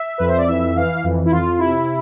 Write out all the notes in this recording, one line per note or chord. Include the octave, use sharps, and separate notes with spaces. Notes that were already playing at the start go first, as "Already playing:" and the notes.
Already playing: E5
F2 B4
C5
D5
E3 E5
E3 F5
F2
E4
F2 F4
C3 E4